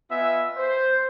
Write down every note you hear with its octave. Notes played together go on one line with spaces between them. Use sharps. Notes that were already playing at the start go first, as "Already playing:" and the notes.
B3 F4 D#5 E5 G#5
C5